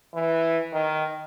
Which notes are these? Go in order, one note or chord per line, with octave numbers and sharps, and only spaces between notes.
E3
D#3